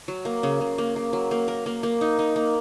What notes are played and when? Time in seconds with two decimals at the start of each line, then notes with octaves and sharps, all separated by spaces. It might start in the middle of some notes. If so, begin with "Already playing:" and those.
0.08 F#3
0.25 A#3
0.43 C#3
0.61 C#3
0.78 A#3
0.96 A#3
1.13 F#3
1.31 A#3
1.48 A#4
1.66 A#3
1.83 A#3
2.01 D#4
2.19 D#4
2.36 A#3